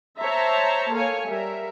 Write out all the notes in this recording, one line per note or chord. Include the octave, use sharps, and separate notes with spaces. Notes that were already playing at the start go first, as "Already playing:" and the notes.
C5 C#5 E5 A5 A#5
A#3 A4 C#5 F5 G#5
G3 A#4 E5